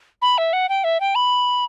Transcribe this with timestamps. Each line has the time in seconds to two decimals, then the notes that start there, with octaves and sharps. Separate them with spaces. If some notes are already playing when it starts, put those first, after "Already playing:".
0.22 B5
0.38 E5
0.53 F#5
0.69 G5
0.84 E5
1.00 G5
1.15 B5